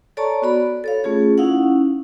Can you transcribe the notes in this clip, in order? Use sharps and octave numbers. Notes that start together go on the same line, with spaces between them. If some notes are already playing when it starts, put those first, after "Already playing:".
A4 C#5 D5 A5 A#5 C#6
B3 F#4 D5 B5
A4 C#5 F5
A3 C#4 F4 G#4
C#4 D#4 E4 F5 F#5